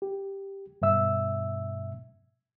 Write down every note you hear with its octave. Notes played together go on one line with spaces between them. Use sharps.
G4
G2 B2 E5 E6